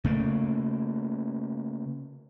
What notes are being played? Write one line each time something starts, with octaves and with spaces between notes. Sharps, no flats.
C#3 A3 A#3